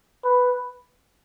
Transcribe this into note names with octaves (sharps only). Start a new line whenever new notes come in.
B4